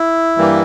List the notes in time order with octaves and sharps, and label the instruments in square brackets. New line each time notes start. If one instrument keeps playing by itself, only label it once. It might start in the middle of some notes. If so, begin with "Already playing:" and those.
Already playing: [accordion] E4
G2 E3 G3 A#3